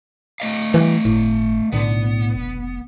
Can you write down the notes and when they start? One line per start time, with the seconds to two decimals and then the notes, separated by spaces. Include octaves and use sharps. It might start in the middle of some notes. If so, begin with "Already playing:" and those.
0.40 A3 D#5 F5
0.74 E3 F#3 G3
1.05 G1 A2
1.72 B1 A2 D3 B3
2.35 F1